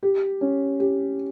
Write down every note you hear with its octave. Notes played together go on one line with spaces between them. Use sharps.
G4
C#4
G4